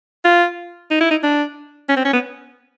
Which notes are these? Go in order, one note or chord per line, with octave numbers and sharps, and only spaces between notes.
F4
D#4
E4
D#4
D4
C#4
C4
C#4
B3